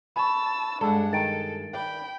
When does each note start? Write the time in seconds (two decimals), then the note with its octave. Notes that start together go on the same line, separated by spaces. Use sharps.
0.16 A5 B5 C#6 E6
0.81 G2 G#3 D4 A4 F#5
1.13 D#3 A4 A6 D7
1.73 B4 D5 G5 B5